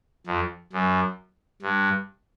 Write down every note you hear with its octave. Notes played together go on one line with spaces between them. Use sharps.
F2
F#2
G2